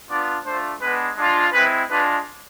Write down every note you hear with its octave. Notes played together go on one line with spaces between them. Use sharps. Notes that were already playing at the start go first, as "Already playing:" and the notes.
B3 D4 F4 D5
A3 D4 F4 C5
G#3 B3 D4 B4
G#3 D4 F4
G#3 C4 E4 B4
G#3 D4 F4 B4